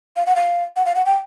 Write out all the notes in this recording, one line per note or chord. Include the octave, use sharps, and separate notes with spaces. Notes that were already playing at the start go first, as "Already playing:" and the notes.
F5
F#5
F5
F#5
F5
F#5
G5